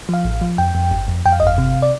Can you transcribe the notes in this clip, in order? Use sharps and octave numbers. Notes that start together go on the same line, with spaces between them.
F3 F5
A1
F3
F2 G5
F2
G1
F2
F2 G5
F5
G1 D#5
F5
C3
D5